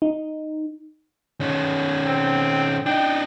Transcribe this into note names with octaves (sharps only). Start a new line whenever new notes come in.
D#4
D#3 C#4
C4
D4 D#4 G5